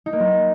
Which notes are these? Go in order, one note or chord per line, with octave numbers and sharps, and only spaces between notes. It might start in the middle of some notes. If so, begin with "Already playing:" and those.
D#4
A#3
F#3